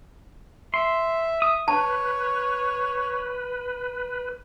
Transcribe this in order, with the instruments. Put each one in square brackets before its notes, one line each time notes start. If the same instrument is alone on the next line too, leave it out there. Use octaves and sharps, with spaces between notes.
[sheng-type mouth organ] E5 [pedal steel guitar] C6
[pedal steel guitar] D#6
[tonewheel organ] B4 [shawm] C#5 [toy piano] A5